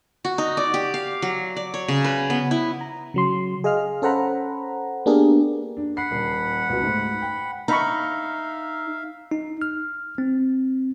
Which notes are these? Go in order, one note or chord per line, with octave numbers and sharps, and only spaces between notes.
F#4
D#4
D5
G4
F5
F#3
D5
C#5
C#3
B4
B3
E4
A#5
C#3 F#3 C6
G#4 D#5 F5 F6
C#4 A4 C5 F#5 A#5 B5
A#3 B3 D4 G4 G#4 A#4
D4
F#5 B5 C7
D#1
C#2 B2
G#2 A3
G5
D#4 E5 F5 A#5 B5 C#6
D#4
F6
C4